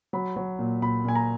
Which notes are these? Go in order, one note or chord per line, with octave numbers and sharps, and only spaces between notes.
F#3 B5
F#3
A#2
A#2 B5
A#2 G#5
A#5